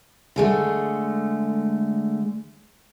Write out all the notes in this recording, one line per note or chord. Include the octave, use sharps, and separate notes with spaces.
D3 G#3 A3